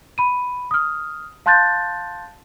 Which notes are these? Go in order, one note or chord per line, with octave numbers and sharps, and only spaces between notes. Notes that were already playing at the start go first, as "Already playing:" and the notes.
B5 D#7
D#6 F6
F5 A5 C6 F#6 G6 A6